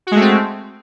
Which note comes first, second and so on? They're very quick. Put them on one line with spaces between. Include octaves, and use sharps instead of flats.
F#4 G#3 A3 C4